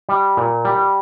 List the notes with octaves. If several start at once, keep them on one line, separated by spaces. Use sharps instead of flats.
G3
A#2
G3